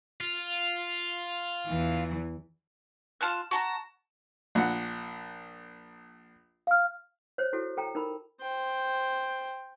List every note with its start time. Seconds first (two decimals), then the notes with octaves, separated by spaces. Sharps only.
0.21 F4
1.67 E2 E3
3.21 F4 A5 F6 F#6
3.51 F#4 A5 A#5
4.55 A#1 F#5
6.67 F5 F6
7.38 C5 C#5
7.53 E4 F#4 A4
7.77 A4 G5 A#5
7.95 D#4 A#4 B5
8.41 C5 G5